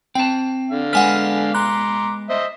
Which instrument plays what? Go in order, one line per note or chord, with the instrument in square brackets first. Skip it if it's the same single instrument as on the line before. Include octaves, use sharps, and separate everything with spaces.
[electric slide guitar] C4 A5 [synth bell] G5
[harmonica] D3 F5
[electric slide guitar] G#3 B3 B4 [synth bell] F#5 G#5 F6
[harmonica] A#5 C6 D6 [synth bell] F#6
[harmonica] C5 D#5 E5